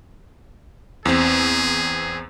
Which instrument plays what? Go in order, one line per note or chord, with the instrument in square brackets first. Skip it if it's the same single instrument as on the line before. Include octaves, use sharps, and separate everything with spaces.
[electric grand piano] E2 C4 [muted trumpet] G#4